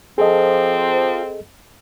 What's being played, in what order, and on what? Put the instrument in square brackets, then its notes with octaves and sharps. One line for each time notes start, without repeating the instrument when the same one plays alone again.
[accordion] F3 [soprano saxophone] C4 [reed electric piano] G#4 A4 D#5